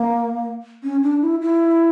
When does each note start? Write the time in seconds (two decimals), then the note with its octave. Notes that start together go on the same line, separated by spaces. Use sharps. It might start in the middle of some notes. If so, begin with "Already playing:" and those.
Already playing: A#3
0.83 C#4
1.03 D4
1.22 E4
1.41 E4